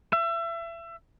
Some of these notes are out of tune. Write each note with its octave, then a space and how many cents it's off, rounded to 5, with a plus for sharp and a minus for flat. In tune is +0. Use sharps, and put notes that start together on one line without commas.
E5 +30